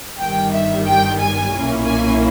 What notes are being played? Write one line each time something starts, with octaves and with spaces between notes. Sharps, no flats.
G1 G2 D#3 G3 G5
E5
G5
G#5
B1 A#2 A#3 C#4 E4
G#5